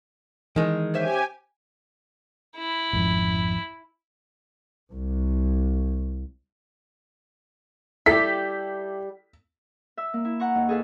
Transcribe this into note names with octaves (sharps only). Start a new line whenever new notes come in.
D#3 E3 G#3
C#4 G4 C5 E5 G#5
E4
G#1 F2
C2
G3 E4 G4 A4 B6
E5 E6
A#3
E4
F#5 A#5 C#6
D#2
G#4 A4 B4 F5